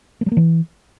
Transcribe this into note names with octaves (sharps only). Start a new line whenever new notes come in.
A#3
G3
A#3
E3